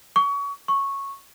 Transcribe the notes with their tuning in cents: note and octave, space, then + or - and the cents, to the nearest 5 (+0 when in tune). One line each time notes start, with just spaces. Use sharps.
C#6 +30
C#6 -5